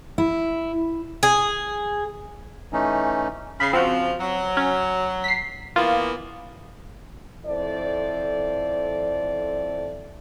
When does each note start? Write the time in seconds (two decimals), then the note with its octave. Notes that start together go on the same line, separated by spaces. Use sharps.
0.18 E4
1.23 G#4
2.73 E3 A3 C#4 D#4
3.60 C#3 B5 C7
3.73 C#3 F3 C4 F#4
4.20 F#3
4.57 C#4
5.24 B6 C7
5.76 E3 A#3 B3 F4
7.46 F2 E4 A4 C5 D5